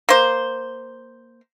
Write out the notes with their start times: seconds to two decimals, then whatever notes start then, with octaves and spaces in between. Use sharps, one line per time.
0.09 A#3 C5